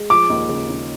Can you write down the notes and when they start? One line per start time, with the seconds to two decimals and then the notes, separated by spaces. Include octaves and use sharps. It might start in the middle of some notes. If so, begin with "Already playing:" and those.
Already playing: G#3
0.10 F3 D6
0.30 D#2
0.49 C#3
0.70 D#2